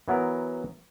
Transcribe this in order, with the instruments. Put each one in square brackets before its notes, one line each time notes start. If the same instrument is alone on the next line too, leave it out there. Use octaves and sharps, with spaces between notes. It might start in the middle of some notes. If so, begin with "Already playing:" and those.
[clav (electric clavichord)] E3 F#3 B3 A#4